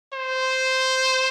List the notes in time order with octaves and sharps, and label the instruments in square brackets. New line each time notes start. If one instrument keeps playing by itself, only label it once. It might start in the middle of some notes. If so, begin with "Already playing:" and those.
[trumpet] C5